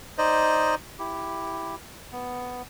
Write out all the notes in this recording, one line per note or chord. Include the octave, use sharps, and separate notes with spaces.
D#4 C5 D5 D#5
E4 G4
B3